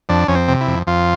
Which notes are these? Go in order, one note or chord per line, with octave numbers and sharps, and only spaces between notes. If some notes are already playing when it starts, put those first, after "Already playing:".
F2 D4
F2 C#4
C4
C3
E4
F2
F2 F4